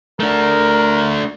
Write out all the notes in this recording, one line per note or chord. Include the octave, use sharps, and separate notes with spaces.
A3 D4 A#4